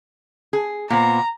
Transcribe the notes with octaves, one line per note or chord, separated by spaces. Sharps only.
G#4
A#2 B3 C5 A#5